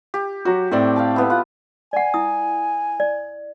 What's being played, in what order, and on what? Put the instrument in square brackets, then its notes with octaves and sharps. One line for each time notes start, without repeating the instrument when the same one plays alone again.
[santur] G4
[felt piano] F#3 F#4
[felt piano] A2 C4 D5 [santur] A3
[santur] F5 G5 A5
G3 B3 E4
F4 F#5
[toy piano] D5 F#5 [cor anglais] G#5
[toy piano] E4 D#6
D5